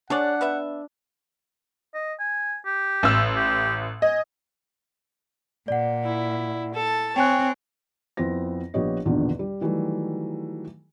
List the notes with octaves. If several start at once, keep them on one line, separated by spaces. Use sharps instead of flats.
D4 G#4 C#5 D5 F#5
B3 B4 E5
D#5
G#5
G4
A1 E6
G4
D#5 G#5
A#2 D5 F#5
E4
A4 A5
C4 C#5 G5 G#5 F#6
F2 B3 E4 C5 A#6
A#1 F3 B3 G4 C#5 D#5
A#1 E2 B2 D3 D#3 F3
G3
D#3 E3 F#3 G3 A3